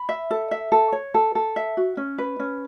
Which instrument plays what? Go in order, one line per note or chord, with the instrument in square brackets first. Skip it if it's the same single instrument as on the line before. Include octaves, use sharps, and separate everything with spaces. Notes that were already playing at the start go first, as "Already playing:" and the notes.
Already playing: [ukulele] B5
E5
A4
E5
A4
C#5
A4
A4
E5
F#4
C#4
B4
C#4